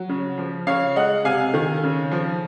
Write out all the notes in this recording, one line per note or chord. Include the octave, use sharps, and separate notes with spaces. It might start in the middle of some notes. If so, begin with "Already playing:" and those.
Already playing: F#3
C#3
F3
C#3 C#5 F5
G#3 D#5 F#5
C3 F5 G#5
D#3
C#3
F3